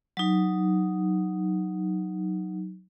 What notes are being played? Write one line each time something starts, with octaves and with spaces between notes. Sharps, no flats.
F#3 D#4